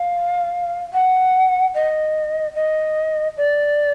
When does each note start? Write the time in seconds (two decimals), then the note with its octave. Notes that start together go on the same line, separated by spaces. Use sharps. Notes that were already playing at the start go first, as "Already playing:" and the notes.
Already playing: F5
0.93 F#5
1.74 D#5
2.55 D#5
3.37 D5